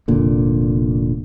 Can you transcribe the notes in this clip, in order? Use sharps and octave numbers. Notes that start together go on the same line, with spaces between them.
F1 A#2 D3